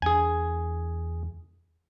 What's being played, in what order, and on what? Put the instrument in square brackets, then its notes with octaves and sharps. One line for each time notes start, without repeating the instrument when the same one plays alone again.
[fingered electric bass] E2 A#3 D4 [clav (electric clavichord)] G#4 G#5